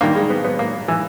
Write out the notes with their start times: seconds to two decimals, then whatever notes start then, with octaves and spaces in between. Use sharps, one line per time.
0.01 G2 D#3 A#3
0.15 G#3
0.30 B3
0.45 B3
0.59 A#3
0.88 E3